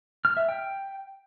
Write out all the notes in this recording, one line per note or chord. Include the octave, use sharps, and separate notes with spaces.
F6
E5
G5